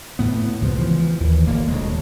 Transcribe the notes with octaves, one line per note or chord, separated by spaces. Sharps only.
D2 A2 B3
C#2 C3 F3
E3 F3
D#2 E3
D#1 A#2 D3 A#3
D#1 D2 G#3